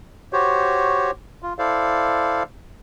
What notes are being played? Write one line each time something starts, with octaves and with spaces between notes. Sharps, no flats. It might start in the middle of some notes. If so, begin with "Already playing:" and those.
F#4 G4 C5 C#5
F4
E4 A4 C5 D5 F5